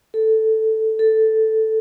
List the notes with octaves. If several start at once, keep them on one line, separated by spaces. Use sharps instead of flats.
A4
A4